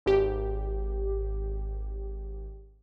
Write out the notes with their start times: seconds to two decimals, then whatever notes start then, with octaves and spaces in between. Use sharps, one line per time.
0.06 G#1 G4